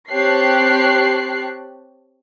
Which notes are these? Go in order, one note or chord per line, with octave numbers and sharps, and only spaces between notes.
C4 G4 C#5 A5 F#6 C7